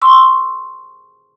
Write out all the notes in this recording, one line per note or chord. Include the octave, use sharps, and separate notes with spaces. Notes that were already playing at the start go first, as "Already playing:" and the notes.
C6 C#6 E6